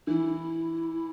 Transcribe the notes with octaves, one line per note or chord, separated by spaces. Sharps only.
E3 E4